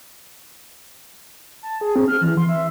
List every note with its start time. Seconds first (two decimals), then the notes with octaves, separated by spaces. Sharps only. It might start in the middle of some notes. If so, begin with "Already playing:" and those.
1.63 A5
1.81 G#4
1.96 C4
2.08 F6
2.21 E3
2.37 C6
2.49 E5